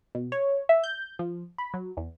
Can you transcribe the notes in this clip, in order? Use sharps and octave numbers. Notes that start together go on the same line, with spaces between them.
B2
C#5
E5
G6
F3
B5
F#3
E2